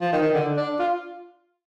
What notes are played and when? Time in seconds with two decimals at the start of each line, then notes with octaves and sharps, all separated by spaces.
0.01 F3
0.13 D#3
0.23 D#3
0.34 D3
0.57 D4
0.79 F4